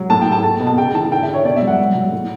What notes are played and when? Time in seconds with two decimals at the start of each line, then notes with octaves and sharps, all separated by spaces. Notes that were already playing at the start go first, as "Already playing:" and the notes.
Already playing: F#3
0.10 A2 A5
0.21 A2 G5
0.32 A5
0.44 A3 A5
0.60 B2
0.67 A5
0.77 C#3 G5
0.94 E3 A5
1.12 D3 G5
1.23 D3 E5
1.34 C#5
1.44 B2 D5
1.56 E5
1.62 F#3
1.67 F#5
1.79 F#3
1.95 F#3
2.12 A2